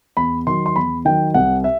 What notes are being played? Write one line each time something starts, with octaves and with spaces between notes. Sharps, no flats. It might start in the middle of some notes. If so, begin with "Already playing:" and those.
E2 B5
D#3 F#3 C6
C6
E2 B5
D#3 F#3 G5
C2 F#5
E5